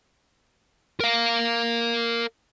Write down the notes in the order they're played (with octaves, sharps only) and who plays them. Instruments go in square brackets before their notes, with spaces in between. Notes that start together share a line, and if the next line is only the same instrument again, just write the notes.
[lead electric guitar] A#4 F5